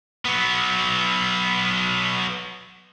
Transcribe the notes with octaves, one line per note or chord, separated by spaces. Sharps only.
F#3 B3